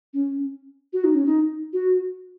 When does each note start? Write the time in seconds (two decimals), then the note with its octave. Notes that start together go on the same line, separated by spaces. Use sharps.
0.14 C#4
0.93 F#4
1.04 D#4
1.14 C#4
1.26 D#4
1.73 F#4